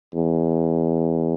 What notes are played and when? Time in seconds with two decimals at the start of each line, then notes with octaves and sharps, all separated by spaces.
0.14 E2